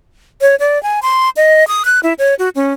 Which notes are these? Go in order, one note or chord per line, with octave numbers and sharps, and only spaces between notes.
C#5
D5
G#5
C6
D#5
D#6
F#6
E4
C#5
F#4
C#4